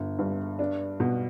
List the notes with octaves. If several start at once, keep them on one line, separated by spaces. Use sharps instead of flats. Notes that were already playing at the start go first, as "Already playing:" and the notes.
Already playing: G1
G2
D4
B2